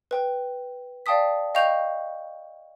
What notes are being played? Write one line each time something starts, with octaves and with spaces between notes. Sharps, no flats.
B4 G5
D5 F5 G5 A5 D#6 B6
D#5 F5 G5 C#6 G6 F7